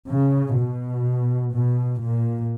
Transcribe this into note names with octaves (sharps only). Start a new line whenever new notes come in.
C#3
B2
B2
A#2